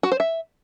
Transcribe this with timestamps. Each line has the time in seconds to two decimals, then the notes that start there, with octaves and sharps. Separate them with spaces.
0.03 F#4
0.12 C5
0.20 E5